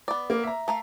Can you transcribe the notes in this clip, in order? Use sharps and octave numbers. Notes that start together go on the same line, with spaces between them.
B3 D5
A#3
E5 A#5
A3 A#4 F5